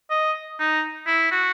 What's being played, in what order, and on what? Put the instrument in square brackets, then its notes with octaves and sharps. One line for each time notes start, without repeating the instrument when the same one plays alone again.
[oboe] D#5
D#4
E4
F#4